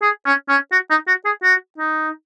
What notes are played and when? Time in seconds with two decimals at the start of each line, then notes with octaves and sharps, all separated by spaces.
0.02 G#4
0.25 C#4
0.49 C#4
0.72 F#4
0.90 D#4
1.08 F#4
1.25 G#4
1.43 F#4
1.78 D#4